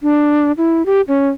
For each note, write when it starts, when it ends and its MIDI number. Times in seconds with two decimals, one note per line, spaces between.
0.03 0.52 62
0.57 0.85 64
0.86 1.01 67
1.08 1.29 61